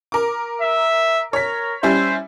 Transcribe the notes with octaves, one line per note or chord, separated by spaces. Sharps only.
A#4 D6
E5
A#4 C#5 B6
G3 C#4 E4 C5